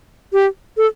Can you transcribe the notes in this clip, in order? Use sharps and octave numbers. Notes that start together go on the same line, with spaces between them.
G4
A4